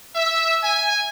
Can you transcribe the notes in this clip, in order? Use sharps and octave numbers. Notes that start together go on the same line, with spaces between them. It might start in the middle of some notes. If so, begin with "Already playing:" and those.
E5
G#5